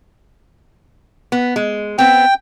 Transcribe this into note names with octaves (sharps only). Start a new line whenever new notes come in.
B3
G#3
B3 C4 G5